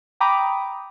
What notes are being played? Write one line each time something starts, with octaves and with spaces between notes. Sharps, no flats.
G5 A#5 B5 D6 D#6